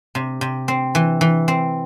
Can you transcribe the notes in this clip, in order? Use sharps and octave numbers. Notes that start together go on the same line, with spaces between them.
C3
C3
C4
E3
E3
C4